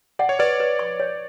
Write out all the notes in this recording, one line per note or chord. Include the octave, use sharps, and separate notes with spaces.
D5 F#5
C#5
B4 D5
B4
C#6
C#5